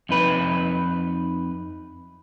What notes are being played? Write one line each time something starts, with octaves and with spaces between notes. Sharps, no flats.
F2 D#4 B4